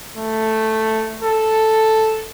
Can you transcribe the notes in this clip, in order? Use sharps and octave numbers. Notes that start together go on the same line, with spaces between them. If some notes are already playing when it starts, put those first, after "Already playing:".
A3
A4